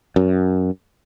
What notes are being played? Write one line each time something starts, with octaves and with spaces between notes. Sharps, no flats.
F#2